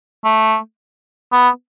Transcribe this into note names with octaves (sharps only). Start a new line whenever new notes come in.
A3
B3